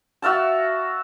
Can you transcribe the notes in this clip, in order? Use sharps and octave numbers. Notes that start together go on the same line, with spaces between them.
F#4 E5 F5 A5